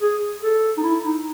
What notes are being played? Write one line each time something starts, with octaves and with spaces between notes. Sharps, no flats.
G#4
A4
D#4
E4
D#4